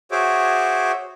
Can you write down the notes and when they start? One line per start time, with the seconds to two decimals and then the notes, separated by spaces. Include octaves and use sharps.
0.11 F#4 G#4 C5 C#5 E5 D6